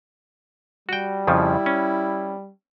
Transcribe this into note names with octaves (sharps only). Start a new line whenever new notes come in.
G3 F#4 G5
F2 C#3 F3 E4
C#4